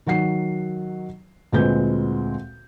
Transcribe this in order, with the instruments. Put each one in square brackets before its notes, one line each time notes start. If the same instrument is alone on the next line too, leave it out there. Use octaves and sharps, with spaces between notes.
[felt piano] D#3 F#3 F#5 C7
D2 A#2 G#3 C4 B4 G6